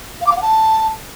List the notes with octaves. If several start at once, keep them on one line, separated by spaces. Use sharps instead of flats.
F5
D6
F5
F#5
A5